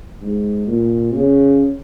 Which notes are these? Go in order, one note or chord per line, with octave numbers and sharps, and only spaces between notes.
G#2
A#2
C#3